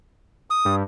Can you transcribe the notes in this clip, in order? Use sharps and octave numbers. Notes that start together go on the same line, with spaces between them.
D#6
G2